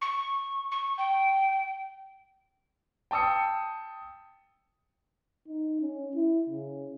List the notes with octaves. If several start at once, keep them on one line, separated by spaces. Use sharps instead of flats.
C#6
C#6
G5
G5 A5 D#6 E6 C#7
D#4
C#4
E4
C#3